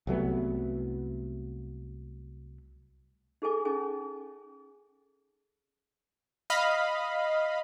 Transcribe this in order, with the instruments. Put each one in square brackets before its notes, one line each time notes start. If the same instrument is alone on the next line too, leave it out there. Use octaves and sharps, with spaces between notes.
[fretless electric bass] C2 F#3 A3 B3
[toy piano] D#4 G#4 A4 G#5 D6
C#4 D#4 G#4 G#5
[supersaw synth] D#5 F5 B5